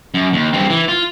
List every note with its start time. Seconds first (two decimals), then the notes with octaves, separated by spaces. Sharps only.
0.14 F#2
0.33 D#2
0.53 G2 C4
0.70 E3
0.88 F4